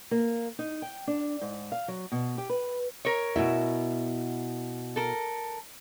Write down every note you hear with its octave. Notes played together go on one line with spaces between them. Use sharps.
A#3
D#4
G5
D4
G#2
F5
F#3
B2
G4
B4
A#4 C#5
B2 E4 E5
A4 A#4